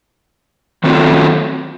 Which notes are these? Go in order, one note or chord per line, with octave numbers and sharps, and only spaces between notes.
D#3 F#3 A3 C4 F4